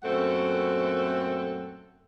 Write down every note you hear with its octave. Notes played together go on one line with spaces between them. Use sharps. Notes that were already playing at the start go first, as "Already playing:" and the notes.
F#2 A#2 A3 C4 A4 F#5